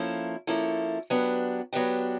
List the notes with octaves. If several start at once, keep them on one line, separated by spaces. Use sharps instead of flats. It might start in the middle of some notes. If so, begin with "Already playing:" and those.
Already playing: F3 A#3 C#4 E4 A4
F3 A#3 C#4 E4 A4
F#3 B3 D4 G4
F#3 B3 D4 G4